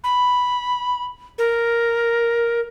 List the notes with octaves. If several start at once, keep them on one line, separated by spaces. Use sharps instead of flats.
B5
A#4